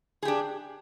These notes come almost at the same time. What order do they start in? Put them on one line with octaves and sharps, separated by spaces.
G#4 G4 D4